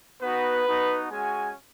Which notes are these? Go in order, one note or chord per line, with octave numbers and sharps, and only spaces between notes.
B3 D#4 F#4 B4
B3 D#4 F#4
G#3 C#4 F#4 G#5